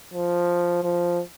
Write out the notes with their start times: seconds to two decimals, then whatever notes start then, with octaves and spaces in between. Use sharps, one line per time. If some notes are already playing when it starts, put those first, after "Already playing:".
0.14 F3
0.83 F3